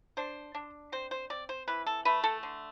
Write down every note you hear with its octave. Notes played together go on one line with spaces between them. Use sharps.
D4 C5
D4
C4 C5
C5
C4 D5
C5
E3 B4
A4
A3 B4
A4
D3